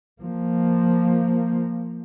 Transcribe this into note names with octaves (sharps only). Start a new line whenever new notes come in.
F3 A#3